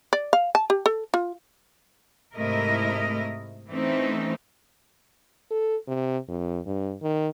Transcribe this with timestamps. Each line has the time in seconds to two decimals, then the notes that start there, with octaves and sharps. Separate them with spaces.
0.13 D5
0.33 F5
0.55 A5
0.70 G4
0.86 A4
1.14 F4
2.36 G#2 C3 A3 E4 A#4 D#5
3.69 E3 A3 C4 C#4 D#4
5.51 A4
5.88 C3
6.28 F2
6.66 G2
7.02 D#3